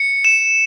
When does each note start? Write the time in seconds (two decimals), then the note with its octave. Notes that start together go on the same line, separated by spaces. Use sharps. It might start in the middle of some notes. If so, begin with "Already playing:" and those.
Already playing: C#7
0.24 E7